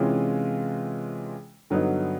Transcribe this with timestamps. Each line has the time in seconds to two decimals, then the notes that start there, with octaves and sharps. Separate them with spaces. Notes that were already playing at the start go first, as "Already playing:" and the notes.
Already playing: C3 E3 G#3 C#4 F4
1.70 G2 D3 F#3 B3 D#4